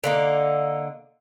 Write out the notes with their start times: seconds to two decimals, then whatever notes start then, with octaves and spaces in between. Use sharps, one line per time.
0.04 D3 A#3 D#4